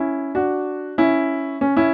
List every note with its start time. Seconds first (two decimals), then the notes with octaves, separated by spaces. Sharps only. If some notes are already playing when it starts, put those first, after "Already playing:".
Already playing: C#4 E4
0.35 D4 F#4
0.98 C#4 E4
1.61 C#4
1.77 C#4 E4